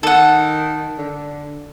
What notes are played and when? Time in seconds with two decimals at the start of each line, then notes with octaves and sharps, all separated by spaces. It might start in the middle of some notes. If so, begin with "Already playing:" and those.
0.03 D#3 A4 F#5
0.98 D3